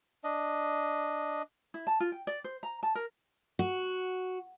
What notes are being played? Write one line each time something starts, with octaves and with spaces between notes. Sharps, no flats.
D4 D#5
E4
A5
F4
G5
D5
C5
A#5
A5
A#4
F#4